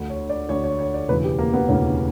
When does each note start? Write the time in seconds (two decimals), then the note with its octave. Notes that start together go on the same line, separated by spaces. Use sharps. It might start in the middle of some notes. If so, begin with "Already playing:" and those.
Already playing: D2 D3
0.10 C#5
0.29 D5
0.49 D2 D3 C#5
0.64 C#5
0.79 C#5
0.94 D5
1.09 E1 D2 C#3 E3 B4
1.24 G4
1.39 A#3
1.54 B3
1.68 E1 D2 C#3 E3 C#4